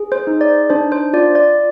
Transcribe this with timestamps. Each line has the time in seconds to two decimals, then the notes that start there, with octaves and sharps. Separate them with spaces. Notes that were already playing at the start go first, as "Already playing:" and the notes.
Already playing: G#4
0.12 C5
0.27 D#4
0.41 D5
0.70 D4 C5
0.92 C5
1.13 F4 D5
1.35 D5